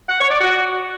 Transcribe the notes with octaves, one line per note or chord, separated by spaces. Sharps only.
F#5
C#5
D5
F#4